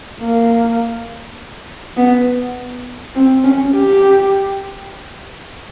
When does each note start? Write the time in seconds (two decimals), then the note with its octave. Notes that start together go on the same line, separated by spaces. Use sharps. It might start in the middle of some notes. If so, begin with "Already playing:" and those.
0.20 A#3
1.97 B3
3.15 C4
3.44 C#4
3.73 G4